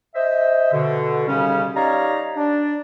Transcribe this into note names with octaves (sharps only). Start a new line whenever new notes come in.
C5 D#5 E5
B2 D3
D#2 C#3 G3 C#4
D#4 G4 C#5 D5 F5 A#5
D4 D5